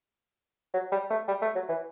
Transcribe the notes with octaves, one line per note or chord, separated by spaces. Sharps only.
F#3
G3
A3
G3
A3
F#3
E3